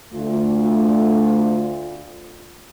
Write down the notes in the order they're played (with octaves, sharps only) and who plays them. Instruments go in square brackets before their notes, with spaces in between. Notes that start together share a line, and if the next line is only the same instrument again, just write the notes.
[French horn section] D2 A3 F4